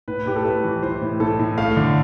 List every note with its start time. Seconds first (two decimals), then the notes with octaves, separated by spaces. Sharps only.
0.08 A2 B4
0.26 A2 G4
0.36 A4
0.45 A3 B4
0.64 E3
0.83 E3 C5
1.02 A2
1.20 A2 A4
1.39 A2
1.58 A3 F5
1.77 D3